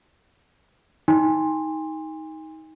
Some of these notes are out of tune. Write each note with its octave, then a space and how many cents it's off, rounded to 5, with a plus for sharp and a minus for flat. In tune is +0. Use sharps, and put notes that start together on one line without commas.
D#4 +20 G#5 -35 C6 +5